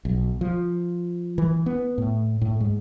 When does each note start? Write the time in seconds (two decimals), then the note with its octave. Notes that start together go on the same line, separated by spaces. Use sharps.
0.05 B1
0.41 F3
1.38 E3
1.66 B3
1.98 A2
2.42 A2
2.61 G#2